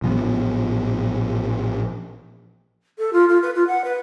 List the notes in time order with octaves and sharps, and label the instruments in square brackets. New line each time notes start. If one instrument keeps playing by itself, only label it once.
[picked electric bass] A1 A#2 F3 B3
[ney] A4
F4
F4
B4
F4
F#5
B4